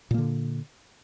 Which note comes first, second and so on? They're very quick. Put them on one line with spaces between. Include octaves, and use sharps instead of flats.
A#2 A#3 D3